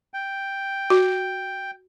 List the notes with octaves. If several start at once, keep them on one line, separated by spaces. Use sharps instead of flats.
G5
F#4